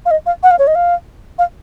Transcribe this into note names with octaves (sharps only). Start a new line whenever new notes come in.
F5
D#5
F5
F#5
F5
C#5
D#5
F5
F5